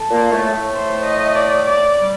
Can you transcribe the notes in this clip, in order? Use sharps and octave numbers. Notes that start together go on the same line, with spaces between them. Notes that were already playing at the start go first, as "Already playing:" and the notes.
Already playing: A4
A#2 A#3
A2 A3
A2 A3
C5
D#5
D5
D5
G3